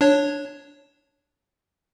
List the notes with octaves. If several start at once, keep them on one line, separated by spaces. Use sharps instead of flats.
D4 C#5